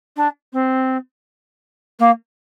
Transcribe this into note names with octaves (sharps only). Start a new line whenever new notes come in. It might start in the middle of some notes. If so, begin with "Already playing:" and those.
D4
C4
A#3